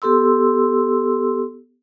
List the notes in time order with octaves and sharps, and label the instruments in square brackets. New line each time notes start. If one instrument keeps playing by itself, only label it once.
[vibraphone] B3 G4 A4 C6 E6